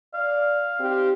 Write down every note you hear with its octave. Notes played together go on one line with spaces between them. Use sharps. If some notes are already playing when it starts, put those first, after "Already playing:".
D5 F5
C4 D#4 G4